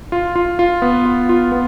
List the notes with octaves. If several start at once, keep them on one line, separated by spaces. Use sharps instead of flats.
F4
F4
F4
B3
F4
F4
B3